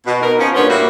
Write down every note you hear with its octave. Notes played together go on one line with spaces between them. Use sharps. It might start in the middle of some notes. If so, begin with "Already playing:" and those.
B2
B3 D#4 A#4
F3 C#4
G2 A#2 D3 B3 C5 C#5
G3 A#3 C4 E4 F#4